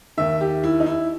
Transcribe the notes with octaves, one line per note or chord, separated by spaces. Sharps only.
D#2 D#3 E5
G4
E4
D#4
E4